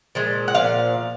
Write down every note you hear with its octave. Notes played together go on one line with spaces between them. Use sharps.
A#2 F3 G#3
F#5
A#2 F3 F5